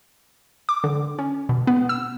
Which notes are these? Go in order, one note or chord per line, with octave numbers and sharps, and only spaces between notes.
D6
D3
C#4
B2
B3
E6